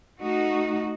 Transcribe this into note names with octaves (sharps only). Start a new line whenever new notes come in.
A3 D#4 F#4